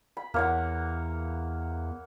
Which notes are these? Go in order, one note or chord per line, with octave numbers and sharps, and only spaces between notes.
B5
E2 A#3 C#5 F#5